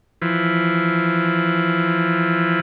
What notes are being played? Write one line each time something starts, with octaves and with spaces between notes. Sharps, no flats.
E3 F3